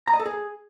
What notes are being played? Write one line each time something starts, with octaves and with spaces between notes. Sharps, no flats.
A#5
D#5
A4
G#4